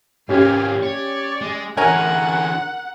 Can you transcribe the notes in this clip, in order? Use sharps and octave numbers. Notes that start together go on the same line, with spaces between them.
G#2 A#3 C#4 G4 F5 G#5
C#5 D5
G#3
D3 E3 A#4 C#5 F#5 G#5 A#5